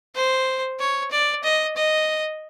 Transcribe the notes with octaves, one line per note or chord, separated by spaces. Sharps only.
C5
C#5
D5
D#5
D#5